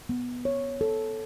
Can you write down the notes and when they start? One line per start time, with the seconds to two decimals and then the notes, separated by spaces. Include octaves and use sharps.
0.09 B3
0.45 C#5
0.81 A4